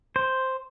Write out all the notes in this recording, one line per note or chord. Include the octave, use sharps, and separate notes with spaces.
C5